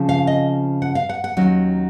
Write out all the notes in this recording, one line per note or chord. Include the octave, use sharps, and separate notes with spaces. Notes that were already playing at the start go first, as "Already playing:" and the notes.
Already playing: C#3 F3 C4
F5
D#5
F#5
F5
F#5
F#5
D#2 D#3 F#3 C#4